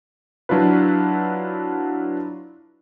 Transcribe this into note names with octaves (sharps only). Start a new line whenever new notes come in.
F#3 D4 E4 F4 B4